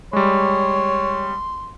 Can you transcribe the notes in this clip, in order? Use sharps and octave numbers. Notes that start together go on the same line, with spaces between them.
G3 G#3 C#5 C6